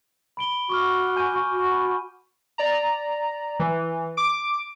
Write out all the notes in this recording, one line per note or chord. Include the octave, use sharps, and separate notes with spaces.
B5 D7 G7
F#4 C#6 D6 F6
G#5 G6 D#7
C#6 G6
F#4
B5
D5 A#5
E3
D6 D7